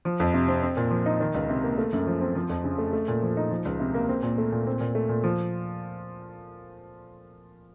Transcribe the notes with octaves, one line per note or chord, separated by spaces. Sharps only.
F3
F2
C3
C4
C4
A#2
F3
D#4
D#3
C#2
C3
A#3
A3
F#2
F3
C4
F3
F2
C#3
A3
A3
A#2
F3
D#4
F3
C#2
C3
A#3
C4
A#2
A3
A#2
C4
A#2
A3
A#2
F3